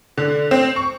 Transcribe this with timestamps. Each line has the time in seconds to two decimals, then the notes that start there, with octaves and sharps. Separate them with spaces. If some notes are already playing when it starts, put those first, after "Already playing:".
0.18 D3
0.51 C4
0.76 C#6